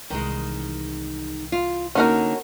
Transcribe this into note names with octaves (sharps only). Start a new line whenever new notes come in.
C2 D#3 E3 G#3
F4
D3 A#3 C#4 D#4 F#4 A#4